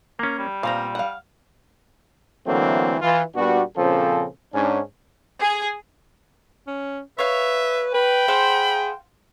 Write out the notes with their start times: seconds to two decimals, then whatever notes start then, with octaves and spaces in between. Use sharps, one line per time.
0.19 A#3 C#4 A#4
0.38 G3
0.63 A#2 B3 C4 F5 A#5
0.95 F5 F#5
2.47 D3 E3 F#3 A3 A#3 C4
3.01 E3 F4
3.35 A#2 G3 B3 D4 F#4
3.76 A#2 C#3 F3 C4 C#4 A4
4.53 G#2 C#4 D4
5.40 G#4
6.67 C#4
7.19 B4 C#5 E5 F5
7.94 B4 G5 B5
8.28 G#4 C5 F5 F#5